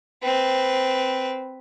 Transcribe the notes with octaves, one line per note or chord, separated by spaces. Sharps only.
C4 B4